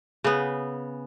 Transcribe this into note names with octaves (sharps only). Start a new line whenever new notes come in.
C#3 B3